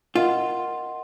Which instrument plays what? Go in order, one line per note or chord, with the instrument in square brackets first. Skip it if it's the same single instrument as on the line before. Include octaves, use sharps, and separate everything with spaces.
[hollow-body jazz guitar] F4 [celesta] A#4 D#5 F#5 C6